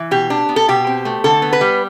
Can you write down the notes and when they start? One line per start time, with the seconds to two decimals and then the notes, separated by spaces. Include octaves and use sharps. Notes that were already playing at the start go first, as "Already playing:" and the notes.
Already playing: E3
0.11 B2 G4
0.30 D4
0.49 B3
0.56 A4
0.68 B2 G4
0.87 C4
1.05 A3
1.24 D3 A4
1.42 B3
1.53 B4
1.61 G3